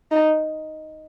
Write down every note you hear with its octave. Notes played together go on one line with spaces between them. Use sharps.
D#4